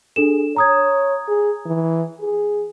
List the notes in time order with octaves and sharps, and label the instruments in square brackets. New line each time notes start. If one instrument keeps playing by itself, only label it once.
[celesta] D4 A4 E7 [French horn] G#4
[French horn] C#5 [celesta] A#5 D#6 G#6
[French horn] G#4
E3
G#4